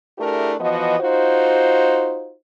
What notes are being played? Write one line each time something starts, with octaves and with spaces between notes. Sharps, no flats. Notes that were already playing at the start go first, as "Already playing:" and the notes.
A3 D4 E4 G4 G#4 A#4
E3 F3 B3 F#4 D#5
D#4 F4 F#4 C5